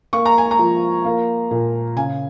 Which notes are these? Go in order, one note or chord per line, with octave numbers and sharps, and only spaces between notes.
A#3 C#6
A#5
G#5
A#5
F3
A#3
A#2
C#3 G#5